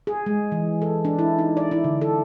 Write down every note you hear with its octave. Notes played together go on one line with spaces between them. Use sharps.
G#4
G#3
E3
A4
D4
E4
D#4
D5
E4
D3
A4